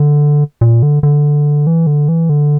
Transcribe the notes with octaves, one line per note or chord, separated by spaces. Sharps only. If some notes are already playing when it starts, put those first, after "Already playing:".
Already playing: D3
A#2
D3
D3
E3
D3
E3
D3